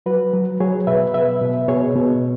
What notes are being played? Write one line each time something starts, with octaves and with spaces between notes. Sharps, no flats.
F#3 F#4 B4
F#3
F#3 G#4 C#5
B2 B4 E5
B2 B4 E5
B2
B2 G#4 C#5
B2